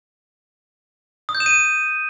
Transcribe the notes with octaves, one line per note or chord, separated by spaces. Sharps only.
D#6
G6
E7
D#7